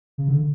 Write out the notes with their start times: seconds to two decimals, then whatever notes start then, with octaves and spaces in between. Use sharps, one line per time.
0.18 C#3
0.28 D3